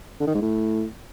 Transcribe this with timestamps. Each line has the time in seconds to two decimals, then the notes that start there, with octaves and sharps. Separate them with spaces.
0.20 D3
0.27 D#3
0.34 G#2
0.41 A2